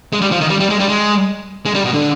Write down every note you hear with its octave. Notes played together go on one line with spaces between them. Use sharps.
G#3
G3
F3
D#3
G3
G3
G#3
G3
G#3
G#3
G3
B2
D3